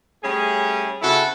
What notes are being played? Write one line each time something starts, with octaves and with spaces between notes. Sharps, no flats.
G3 A3 C#4 G#4
C#3 C4 E4 F#4 A4